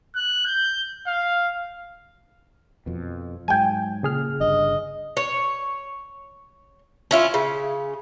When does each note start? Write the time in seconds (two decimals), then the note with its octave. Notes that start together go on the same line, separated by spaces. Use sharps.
0.15 F#6
0.46 G6
1.07 F5
2.86 F2 B2
3.48 G#2 F#3 G#3 G5 G#5
4.03 A#2 C#3 G#4 F6
4.40 G1 G2 D#5
5.17 C#5
7.11 C#4 E4 F4
7.34 C#3